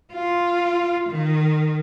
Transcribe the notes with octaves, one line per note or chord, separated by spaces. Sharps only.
F4
D#3